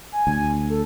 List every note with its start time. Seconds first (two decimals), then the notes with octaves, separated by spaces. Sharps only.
0.12 G#5
0.27 D2
0.70 A4